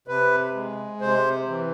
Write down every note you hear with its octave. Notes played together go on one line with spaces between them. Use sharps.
C3 B4
G#3
C3 C5
E3